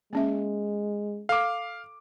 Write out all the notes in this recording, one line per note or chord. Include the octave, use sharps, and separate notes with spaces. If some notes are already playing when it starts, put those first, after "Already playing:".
G#3 A#3 C#4 E5
A4 F5 D6